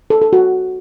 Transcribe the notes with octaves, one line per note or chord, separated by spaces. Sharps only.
A4
A4
F#4